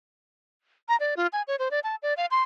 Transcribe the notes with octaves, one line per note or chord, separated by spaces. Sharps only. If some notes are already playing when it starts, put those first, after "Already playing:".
A#5
D5
F4
G#5
C#5
C5
D5
A5
D5
F5
C6